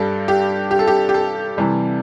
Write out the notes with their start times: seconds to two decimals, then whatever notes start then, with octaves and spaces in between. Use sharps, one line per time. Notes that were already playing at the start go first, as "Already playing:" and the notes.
Already playing: G2 G3 A4
0.28 G4
0.71 G4
0.79 A4
0.87 G4
1.09 G4
1.14 A4
1.58 C3 E3 G3